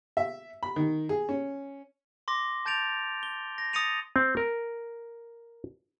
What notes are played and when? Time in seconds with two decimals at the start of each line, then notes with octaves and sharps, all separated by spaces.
0.17 E5
0.63 B5
0.76 D#3
1.09 G#4
1.29 C#4
2.28 C6 D6 A#6
2.65 A5 G6 A6 D7 F7
3.23 G7
3.58 A#6
3.73 D#6 A6 A#6 C#7 D#7 F7
4.16 C4
4.37 A#4